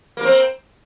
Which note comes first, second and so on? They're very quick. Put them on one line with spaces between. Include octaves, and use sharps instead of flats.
A#3 A#4 C4